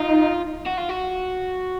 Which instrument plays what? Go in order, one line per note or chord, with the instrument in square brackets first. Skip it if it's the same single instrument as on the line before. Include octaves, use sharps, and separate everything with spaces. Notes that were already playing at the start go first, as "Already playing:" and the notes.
Already playing: [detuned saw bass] D#4 [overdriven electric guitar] F4
[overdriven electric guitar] F#4
F4
F#4